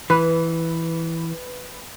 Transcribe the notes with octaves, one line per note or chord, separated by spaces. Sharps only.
E3 B4